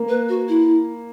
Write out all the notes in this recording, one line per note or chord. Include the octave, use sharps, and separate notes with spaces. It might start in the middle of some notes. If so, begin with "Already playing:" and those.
Already playing: A#3
B4
F#4
E4